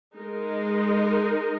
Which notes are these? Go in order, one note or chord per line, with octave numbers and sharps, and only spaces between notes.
G#3 D#4 A#4